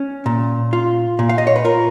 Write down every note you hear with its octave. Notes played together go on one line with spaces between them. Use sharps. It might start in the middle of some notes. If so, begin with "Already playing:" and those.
Already playing: C#4
A#2
F4
A#2
F5
D#5
C#5
B4
F4 A#4